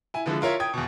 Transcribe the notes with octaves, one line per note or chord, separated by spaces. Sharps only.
E4 G#5
D3 E3 F3 G#3
E4 F4 A#4 C#5 E5
G5 D#6 G#6
E2 B2